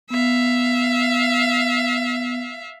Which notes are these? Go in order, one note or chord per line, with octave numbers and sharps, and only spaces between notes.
B3 E5 F5